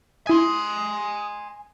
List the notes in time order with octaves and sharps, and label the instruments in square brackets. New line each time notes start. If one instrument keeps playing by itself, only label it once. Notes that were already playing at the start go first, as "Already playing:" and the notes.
[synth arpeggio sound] E4 G#6 [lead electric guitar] G#5 C6 [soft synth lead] D#6